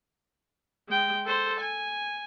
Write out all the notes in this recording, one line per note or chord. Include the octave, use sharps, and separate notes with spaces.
G#3 G5
A4 C5
G#5